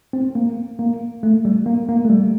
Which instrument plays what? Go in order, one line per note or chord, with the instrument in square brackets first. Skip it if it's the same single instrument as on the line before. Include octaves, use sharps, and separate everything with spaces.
[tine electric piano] C4
A#3
A#3
A3
G3
A#3
A#3
A3
G3